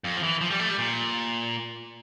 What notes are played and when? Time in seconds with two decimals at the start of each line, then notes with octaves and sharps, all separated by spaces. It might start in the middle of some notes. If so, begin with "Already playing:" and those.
0.04 F2
0.17 F3
0.23 E3
0.41 F3
0.50 G3
0.60 A3
0.69 G3
0.78 A#2